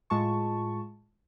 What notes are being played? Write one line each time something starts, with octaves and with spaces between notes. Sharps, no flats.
A2 G#3 F4 A5 C#6